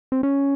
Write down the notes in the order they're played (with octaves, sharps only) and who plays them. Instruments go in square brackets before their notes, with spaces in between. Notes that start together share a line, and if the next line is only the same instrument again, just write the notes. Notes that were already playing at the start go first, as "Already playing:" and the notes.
[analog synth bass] C4
C#4